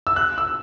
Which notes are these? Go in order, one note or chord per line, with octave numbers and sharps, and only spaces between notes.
E6
F#6
E6